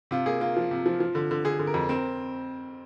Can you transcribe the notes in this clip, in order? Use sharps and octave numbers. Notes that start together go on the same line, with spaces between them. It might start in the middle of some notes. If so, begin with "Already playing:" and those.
C3 F4
A#3 G#4
A#3 F4
F3
C3
F3
F3
D3
D3
D3 G#4
D3
A#4
F2
C4 A#4